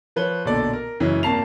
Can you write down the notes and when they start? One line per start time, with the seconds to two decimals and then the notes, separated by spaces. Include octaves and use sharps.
0.16 F3 B4 C#5 G7
0.45 B1 A#2 D3 A4 D5
0.73 A#4
1.00 F#2 C#3 E3 G#3 C#4
1.23 G#1 C3 A#3 A5 C7 F7